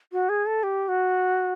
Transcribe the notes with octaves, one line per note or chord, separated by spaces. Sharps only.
F#4
G#4
A4
G4
F#4